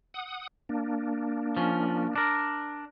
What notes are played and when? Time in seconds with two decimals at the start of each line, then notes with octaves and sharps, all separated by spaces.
0.14 F#5 D#6
0.69 A#3 D4
1.57 F3 C#4
2.16 D4 A#4